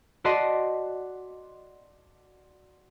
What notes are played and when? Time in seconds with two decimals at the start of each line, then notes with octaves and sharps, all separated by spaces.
0.24 F#4 D5 D#5 A5 C6 B6